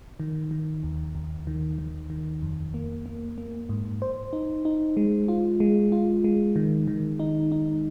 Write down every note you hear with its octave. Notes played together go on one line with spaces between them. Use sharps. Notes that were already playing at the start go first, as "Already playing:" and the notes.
D#3
D#3
D#2
D#2
D#3
D#3
D#3
F2
A#3
A#3
A#3
G#2
C5
D#4
D#4
G#3
F4
G#3
F4
G#3
D#3
D#3
D#4
D#4